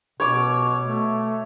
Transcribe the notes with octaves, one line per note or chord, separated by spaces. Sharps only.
B2 C#5 D6
A3